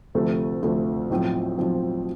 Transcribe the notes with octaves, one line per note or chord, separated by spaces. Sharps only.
D2 C3 F3 A3
D2 C3 F3 A3
B1 A2 F3 C4
B1 A2 F3 C4